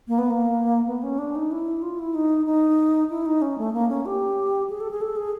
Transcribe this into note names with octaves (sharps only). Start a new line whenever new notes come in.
A#3
B3
A#3
B3
C#4
D4
D#4
E4
F4
E4
D#4
D#4
E4
D#4
C#4
A3
A#3
C#4
G4
G#4
A4
G#4
A4
G#4